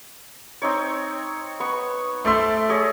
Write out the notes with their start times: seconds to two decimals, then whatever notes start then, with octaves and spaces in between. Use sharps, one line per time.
0.62 C4 D#4 C#5
1.60 B3 C#6
2.25 A3 C5 D5 E5 C6
2.69 G#4 C#5 D#5